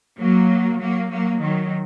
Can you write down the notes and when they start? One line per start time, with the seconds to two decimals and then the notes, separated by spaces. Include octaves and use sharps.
0.18 F#3 A#3
0.79 F#3 A#3
1.10 F#3 A#3
1.41 D#3 F#3